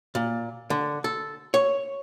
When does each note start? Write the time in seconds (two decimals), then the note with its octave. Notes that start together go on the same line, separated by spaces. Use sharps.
0.15 A#2
0.70 D3
1.04 A4
1.54 C#5